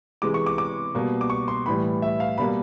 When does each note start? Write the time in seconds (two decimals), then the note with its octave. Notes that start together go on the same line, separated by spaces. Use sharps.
0.22 C3 E3 G#3 D6
0.34 C#6
0.46 D6
0.58 D6
0.95 B2 G3 A#3
1.21 D6
1.30 C#6
1.48 C6
1.66 A2 E3 G3 B5
2.02 E5
2.20 F5
2.38 B2 G3 A#3 B5